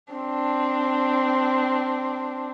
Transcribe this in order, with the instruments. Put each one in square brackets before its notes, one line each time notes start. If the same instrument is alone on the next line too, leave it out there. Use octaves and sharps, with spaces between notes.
[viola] C4 D4